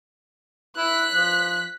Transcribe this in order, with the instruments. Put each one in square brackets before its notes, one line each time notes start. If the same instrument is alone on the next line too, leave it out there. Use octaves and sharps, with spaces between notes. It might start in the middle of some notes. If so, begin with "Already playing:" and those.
[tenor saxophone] E4 [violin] F#6 B6
[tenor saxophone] F3